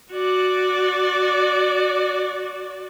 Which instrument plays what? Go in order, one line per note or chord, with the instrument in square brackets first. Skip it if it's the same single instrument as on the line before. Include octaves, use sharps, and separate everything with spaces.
[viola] F#4 D5